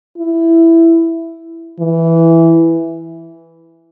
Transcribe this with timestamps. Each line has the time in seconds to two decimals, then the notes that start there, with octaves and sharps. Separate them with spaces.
0.18 E4
1.80 E3